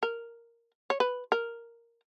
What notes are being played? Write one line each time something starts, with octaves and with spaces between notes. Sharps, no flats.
A#4
C#5
B4
A#4